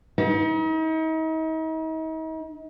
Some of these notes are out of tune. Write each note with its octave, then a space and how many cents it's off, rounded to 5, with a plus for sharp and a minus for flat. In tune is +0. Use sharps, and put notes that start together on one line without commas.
D#4 +40